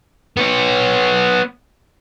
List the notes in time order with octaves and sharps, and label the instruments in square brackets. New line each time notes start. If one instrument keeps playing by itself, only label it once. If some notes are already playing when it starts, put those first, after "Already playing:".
[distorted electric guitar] B3 C#5